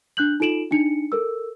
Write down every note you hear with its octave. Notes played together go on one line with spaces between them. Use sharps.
D4 F#6 G6 F#7
D#4 F4 A4 D7 E7 F#7
D4 D#4 C#7
A4 A#4 E6